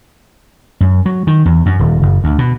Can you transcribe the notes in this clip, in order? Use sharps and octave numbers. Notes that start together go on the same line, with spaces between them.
F#2
F#3
D#3
E2
F#2
D#1
F#1
D2
B2